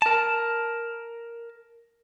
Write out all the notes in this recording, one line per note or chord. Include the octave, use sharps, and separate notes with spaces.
A#4 A5